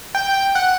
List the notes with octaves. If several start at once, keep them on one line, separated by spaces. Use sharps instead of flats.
G5
F#5